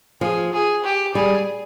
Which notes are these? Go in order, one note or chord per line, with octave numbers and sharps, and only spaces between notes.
F3 G#4
G#4
G4
G3 G#4